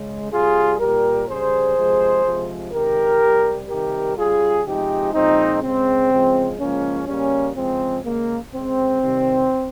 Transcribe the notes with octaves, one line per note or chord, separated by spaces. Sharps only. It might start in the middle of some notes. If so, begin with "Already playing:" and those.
Already playing: C#3 G#3
C3 G3 F4 G#4
A#2 G3 G4 A#4
C#3 G3 G#4 C5
C3 F3 G#3
C3 F3 G#3
C3 D#3 G#3 G4 A#4
C3 G3
C3 D#3 G3 G4 A#4
C#3 G3 F4 G#4
C3 F3 G#3 D#4 G4
A#2 F3 G#3 C4 D#4
C#3 G#3 C4
C#3 F3 G#3
C#3 F3 G#3 A#3 C#4
C#3 G3 A#3 C#4
C#3 F3 G#3 C4
C#3 G#3 A#3
C#3 G#3 C4
C3 D#3 G3